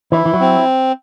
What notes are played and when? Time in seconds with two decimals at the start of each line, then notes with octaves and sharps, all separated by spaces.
0.12 E3 E4
0.26 E3
0.34 F#3
0.40 C4